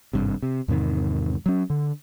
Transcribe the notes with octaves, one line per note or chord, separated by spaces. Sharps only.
G#1 G2 C3
C3
E2 G#2 C3 D#3
F#3 C#4
D3